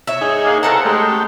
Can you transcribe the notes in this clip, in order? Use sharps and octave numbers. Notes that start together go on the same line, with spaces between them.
C#5 E5
D#4 G#4
D#3 G#3 A#3
E2 C4 C#4 A4 A#4 F#5 A#5
G#3 A3 G4